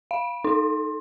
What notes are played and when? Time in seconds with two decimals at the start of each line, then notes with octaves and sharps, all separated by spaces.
0.11 F5
0.44 D#4